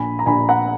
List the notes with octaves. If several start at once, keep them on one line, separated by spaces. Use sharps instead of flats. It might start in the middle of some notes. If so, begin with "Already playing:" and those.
Already playing: A#1 G#5 B5
A#5
A#1 G#5 B5
F#5 A#5